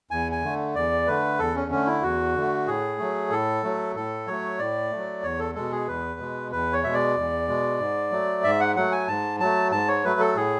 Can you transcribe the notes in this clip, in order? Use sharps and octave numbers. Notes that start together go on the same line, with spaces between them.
E2 G#5
G#5
D3 A3
E2 D5
D3 A3 B4
E2 A4
C#4
D3 A3 C#4
E4
E2 F#4
D3 A3
A2 G#4
F#3 A3
A2 A4
F#3 A3
A2 A4
F#3 A3 C#5
A2 D5
F#3 A3
E2 C#5
A4
B2 G#3 A4
G#4
E2 B4
B2 G#3
E2 B4
C#5
B2 G#3 E5
D5
E2
B2 G#3
G#2
F#3 A3
G#2 E5
F#5
F#3 A3 F#5
G#5
G#2 A5
F#3 A3 A5
G#2 A5
C#5
F#3 A3 B4
A4
A2 G#4